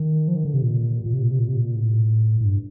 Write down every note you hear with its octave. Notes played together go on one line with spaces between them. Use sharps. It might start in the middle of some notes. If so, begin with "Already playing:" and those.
Already playing: D#3
F3
D#3
D3
C3
A#2
A#2
C3
A#2
C3
A#2
C3
A#2
A2
A2
G2